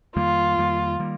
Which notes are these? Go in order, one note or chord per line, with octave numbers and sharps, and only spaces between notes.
F2 D#3 G3 A#3 F4
F2 D#3 G3 A#3
D#3 G3 A#3